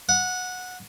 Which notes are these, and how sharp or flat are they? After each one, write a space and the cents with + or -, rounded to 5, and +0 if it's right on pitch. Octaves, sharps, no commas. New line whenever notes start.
F#5 -15